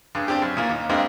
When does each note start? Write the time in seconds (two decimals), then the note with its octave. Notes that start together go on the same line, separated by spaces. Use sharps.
0.15 G2 C#3
0.28 C4 D4 G4
0.42 F#2
0.57 A#2 E3 A#3
0.69 D#2
0.90 G2 G#3 A#3 C4